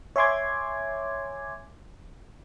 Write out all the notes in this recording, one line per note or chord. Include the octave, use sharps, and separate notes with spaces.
C#5 E5 G#5 C6 D6 G#6